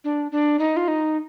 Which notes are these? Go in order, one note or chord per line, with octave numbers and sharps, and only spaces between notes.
D4
D4
D#4
F4
D#4